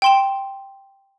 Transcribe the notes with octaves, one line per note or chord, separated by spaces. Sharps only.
G5 C6 E7